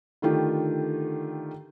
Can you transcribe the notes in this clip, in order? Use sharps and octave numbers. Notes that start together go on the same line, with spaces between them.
D3 D#3 A3 F4 G4